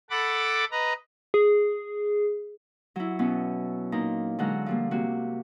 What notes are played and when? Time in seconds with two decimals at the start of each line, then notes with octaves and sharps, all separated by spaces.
0.10 A4 F#5 B5 D6 A6
0.71 B4 D#5 A#5
1.34 G#4
2.96 F#3 E4
3.19 B2 B3 C#4
3.92 A#2 D#4 A#5
4.39 D3 F#3 G#3 F#5 A#5 F6
4.66 F3 G3 A#3
4.91 C3 A#3 F#4